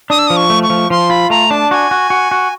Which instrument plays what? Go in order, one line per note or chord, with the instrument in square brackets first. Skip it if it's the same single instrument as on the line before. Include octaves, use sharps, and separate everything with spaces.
[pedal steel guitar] D4 [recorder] D#6
[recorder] E6
[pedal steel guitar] F3 [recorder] D#6
[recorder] C#6
[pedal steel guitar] A3
[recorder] C#6
[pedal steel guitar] F3
[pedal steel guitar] F3 [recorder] C6
[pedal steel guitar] F4 [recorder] B5
[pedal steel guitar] A3 [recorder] A#5
[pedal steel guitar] D4 [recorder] A5
[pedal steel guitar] F#4 [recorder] G#5 A5
[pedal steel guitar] F#4
F#4
F#4